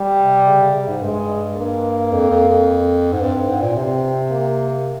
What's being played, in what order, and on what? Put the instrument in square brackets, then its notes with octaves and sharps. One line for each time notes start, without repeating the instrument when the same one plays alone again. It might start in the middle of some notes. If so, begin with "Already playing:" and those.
Already playing: [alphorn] G3
[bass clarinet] C3
C#3
C#3
C3
G#2
[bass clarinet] G2 [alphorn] G#3
[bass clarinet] G2 [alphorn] A#3
[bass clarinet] F2
F2
F2
G#2
[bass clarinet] G2 [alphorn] C4
[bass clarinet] G2
G#2
A#2
[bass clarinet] C3 [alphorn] C4
[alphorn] A#3